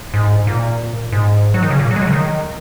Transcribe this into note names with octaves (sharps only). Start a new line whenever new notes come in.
G#2
A#2
G#2
F#3
D#3
C#3
A#2
F#3
G#3
F#3
C#3
D#3